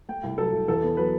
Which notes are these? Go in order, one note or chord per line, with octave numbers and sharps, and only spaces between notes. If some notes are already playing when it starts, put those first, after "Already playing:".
A3 G5
C2
F#3 A4
C2
E2 A4
B3
F#3 B4